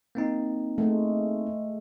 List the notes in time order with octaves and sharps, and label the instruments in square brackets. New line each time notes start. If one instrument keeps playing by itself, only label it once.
[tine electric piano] A#3 C4 D#4
[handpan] G#3 A3